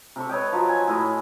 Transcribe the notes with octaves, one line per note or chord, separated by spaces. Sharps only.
C3 A4 C#6
B4 C#5 D#5 G5
F3 F#3
G#5
A2 E4 D#5